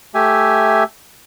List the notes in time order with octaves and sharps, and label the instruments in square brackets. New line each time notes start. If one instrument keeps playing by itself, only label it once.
[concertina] A3 G4 E5 G#5